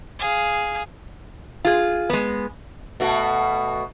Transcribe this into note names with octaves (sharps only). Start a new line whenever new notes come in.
G#4 F5
F4 G#4
G#3 B3
B2 A3 F#4